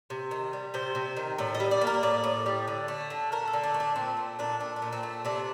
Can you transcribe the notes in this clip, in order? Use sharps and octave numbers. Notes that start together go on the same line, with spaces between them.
C3
D#3
G3
C3 C5
C3
D#3
A2 D5
D#5
G3
D5
A#3
A#4
A2 D5
A2
G3
D3
A3
D3
A3 A#4
A4
D3
D4
A3
D4
A#2 C4
A3
A#2 D4
A3 D4
D4
A#2
C4
A3
C3 D4